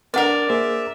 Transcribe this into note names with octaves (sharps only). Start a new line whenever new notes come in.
D4 A#4 B4 D5 F#5
A#3 G#4 C5 E5